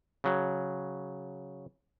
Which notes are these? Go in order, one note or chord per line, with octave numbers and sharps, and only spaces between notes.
C#3 F#3